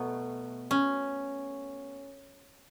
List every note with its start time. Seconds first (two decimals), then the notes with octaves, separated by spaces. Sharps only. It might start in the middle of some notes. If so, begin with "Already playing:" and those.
Already playing: B2 F#3 A3 B3
0.71 C#4